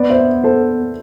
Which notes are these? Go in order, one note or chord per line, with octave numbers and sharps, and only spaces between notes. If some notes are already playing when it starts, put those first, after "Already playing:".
Already playing: B3 B4 D5
C5 E5
A4 C5